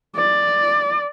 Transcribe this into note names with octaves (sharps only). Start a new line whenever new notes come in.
D5